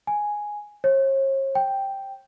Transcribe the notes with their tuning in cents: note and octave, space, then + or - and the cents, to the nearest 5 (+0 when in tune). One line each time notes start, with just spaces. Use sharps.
G#5 +0
C#5 -45
G5 +0